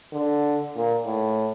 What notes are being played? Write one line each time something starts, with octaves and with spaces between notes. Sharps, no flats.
D3
A#2
A2